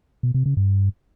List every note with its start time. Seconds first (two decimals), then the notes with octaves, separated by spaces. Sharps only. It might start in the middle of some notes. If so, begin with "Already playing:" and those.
0.23 B2
0.34 C3
0.46 C#3
0.57 G2